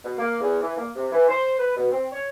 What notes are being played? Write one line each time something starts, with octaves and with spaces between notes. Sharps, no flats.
B2
A#3
E2
E3
A#3
C3
E3
C5
B4
B2
C4
C#5